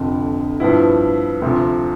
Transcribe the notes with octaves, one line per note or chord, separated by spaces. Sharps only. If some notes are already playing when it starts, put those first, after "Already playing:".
Already playing: F1 F2 D3
G2 F3 B3 E4
D2 C3 F3